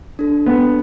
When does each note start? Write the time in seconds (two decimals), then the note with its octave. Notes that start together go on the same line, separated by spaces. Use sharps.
0.19 D4 A4
0.46 B3